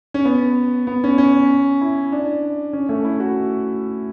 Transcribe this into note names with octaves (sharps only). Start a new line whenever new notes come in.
C#4
B3
B3
C#4
C#4
E4
D4
C#4
A3
E4
F#4